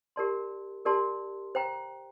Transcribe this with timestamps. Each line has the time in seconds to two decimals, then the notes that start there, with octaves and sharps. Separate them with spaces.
0.16 G4 A#4 D5 A5 C6
0.85 G4 A#4 D5 A5 C6
1.55 C5 G5 A#5